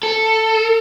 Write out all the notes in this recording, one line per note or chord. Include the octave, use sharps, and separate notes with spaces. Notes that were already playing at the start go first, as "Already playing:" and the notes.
A4